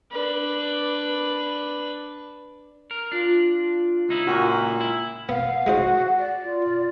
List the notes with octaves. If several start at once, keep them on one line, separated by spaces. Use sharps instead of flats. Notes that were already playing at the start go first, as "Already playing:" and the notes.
D4 B4
A#4
D4 F4
C#2 D#4 E4
A#2 F#4
E4
B3 F5 F#5
G#3 D#4 F#4 C5
D5
F4